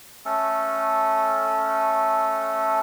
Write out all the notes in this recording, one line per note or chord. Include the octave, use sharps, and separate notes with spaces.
A3 C#4 A4